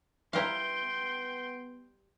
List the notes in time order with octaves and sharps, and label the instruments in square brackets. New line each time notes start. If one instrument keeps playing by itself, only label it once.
[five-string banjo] G3 B4 A#5 [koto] E4 A#4 F5 [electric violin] G5 C6
[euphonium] B3